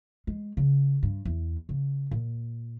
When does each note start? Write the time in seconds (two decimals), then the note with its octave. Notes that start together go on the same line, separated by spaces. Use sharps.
0.27 G#3
0.57 C#3
1.03 G2
1.25 E2
1.69 C#3
2.11 A#2